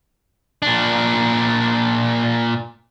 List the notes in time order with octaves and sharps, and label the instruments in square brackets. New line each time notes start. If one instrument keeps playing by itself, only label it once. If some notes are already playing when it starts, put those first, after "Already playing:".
[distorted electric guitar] A#2 D4